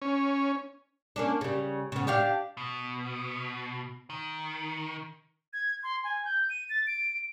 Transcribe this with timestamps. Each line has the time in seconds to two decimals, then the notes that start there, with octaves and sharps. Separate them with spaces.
0.02 C#4
1.16 A#3 C#4 D4
1.41 C#3 G3
1.92 C#3 B3
2.07 D4 G4 F5
2.57 B2
4.10 D#3
5.53 G#6
5.83 C6
6.04 G#5
6.25 G6
6.50 D#7
6.69 A6
6.87 D7